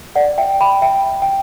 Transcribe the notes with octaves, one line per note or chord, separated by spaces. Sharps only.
D5 F#5
E5 G5
G5 B5
E5 G5
G5